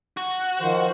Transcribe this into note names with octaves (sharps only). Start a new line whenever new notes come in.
F#4
D#3 F3 C5